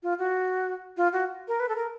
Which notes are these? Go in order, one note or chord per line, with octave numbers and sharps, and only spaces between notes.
F4
F#4
F4
F#4
A#4
B4
A4
A#4